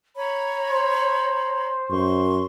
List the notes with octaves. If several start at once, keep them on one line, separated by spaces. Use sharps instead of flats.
C#5 A#5 B5
C5
F#2 C6 C#6